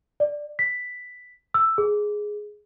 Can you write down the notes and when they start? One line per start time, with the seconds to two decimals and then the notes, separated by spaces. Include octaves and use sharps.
0.20 D5
0.59 B6
1.54 E6
1.78 G#4